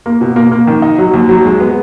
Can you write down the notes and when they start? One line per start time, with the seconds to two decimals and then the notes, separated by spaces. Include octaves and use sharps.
0.06 A#3
0.21 B2
0.36 A#3
0.52 A#3
0.67 D#3
0.82 D#4
0.98 F#3
1.14 D#2
1.29 F#3
1.45 G#3
1.60 B3